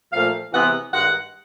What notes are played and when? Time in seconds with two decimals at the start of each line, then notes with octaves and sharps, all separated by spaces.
0.12 A#2 F3 A3 F5
0.53 C3 E3 G#3 B3 F#5
0.93 G2 D#3 G#3 F#5